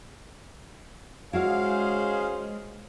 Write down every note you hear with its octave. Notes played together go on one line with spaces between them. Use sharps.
G#3 C#4 E4 F#4 G#4 C5 D5 F5